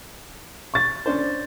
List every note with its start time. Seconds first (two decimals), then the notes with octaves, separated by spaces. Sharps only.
0.74 C#6 A6
1.06 C#4 D4 C5